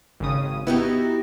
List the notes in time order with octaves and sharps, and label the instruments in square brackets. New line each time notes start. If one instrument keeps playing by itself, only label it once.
[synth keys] G#1 C#3 D#6
[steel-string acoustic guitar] B3 F#4 G4 [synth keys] D#4 E4